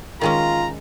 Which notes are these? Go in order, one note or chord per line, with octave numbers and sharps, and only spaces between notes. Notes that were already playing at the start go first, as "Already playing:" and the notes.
D#3 G#3 C#4 F4 A#5